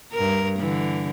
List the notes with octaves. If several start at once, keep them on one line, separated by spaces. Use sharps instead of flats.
G2 A#4
D3 E3